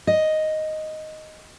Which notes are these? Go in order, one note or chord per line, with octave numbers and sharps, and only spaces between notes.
D#5